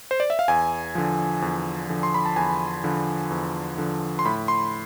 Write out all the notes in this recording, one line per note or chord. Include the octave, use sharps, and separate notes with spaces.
C5
D5
E5
F5
E2 G#5
D3 F3
E2
D3 F3
C6
B5
A5
E2 G#5
D3 F3
E2
D3 F3
C6
A2 B5
C6